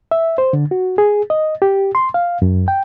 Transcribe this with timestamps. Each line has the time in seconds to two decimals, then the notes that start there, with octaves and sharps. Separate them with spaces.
0.11 E5
0.38 C5
0.53 D3
0.71 F#4
0.98 G#4
1.30 D#5
1.62 G4
1.95 C6
2.14 F5
2.42 F#2
2.68 G5